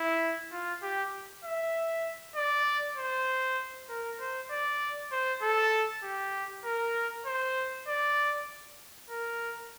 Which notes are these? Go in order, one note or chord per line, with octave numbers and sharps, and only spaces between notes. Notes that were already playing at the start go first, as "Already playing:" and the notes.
Already playing: E4
F4
G4
E5
D5
C5
A#4
C5
D5
C5
A4
G4
A#4
C5
D5
A#4